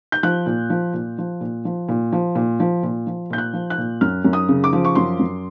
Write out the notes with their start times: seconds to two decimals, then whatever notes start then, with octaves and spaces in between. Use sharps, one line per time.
0.12 G6
0.23 F3 F#6
0.46 A#2
0.70 F3
0.94 A#2
1.18 F3
1.41 A#2
1.65 F3
1.89 A#2
2.12 F3
2.35 A#2
2.60 F3
2.83 A#2
3.07 F3
3.30 A#2 G6
3.38 F#6
3.53 F3
3.70 F#6
3.78 A#2
4.01 F#2 F6
4.25 F#2
4.33 D#6
4.48 C#3
4.64 D6
4.73 F3
4.84 C#6
4.95 F#2 C6
5.19 F#2